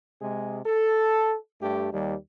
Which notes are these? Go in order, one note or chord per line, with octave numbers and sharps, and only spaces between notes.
C3 G#3 G#4
A4
G2 A3 G4
D#2 G3